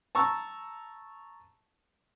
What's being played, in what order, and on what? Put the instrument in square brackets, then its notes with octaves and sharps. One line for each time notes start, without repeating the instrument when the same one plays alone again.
[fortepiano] A5 A#5 C#6 E6